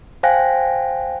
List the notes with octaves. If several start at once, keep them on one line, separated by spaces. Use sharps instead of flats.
C5 F5 G5 G#5 F#6 A#6